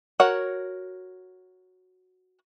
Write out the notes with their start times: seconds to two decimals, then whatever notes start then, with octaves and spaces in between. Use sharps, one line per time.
0.20 F#4 A#4 C#5 F#5